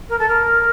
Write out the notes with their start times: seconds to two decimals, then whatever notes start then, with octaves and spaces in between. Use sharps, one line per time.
0.09 A#4
0.19 A4
0.29 A#4